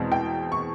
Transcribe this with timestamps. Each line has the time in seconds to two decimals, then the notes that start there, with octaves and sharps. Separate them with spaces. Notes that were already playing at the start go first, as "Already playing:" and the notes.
Already playing: E2 B2 G#3 C4
0.12 G5
0.52 C#6